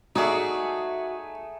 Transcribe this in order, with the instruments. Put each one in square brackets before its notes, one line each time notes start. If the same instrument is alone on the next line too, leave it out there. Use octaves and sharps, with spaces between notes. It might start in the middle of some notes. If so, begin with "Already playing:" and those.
[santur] A3 G#4 D#6 [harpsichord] D#4 D5 [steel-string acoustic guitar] F#4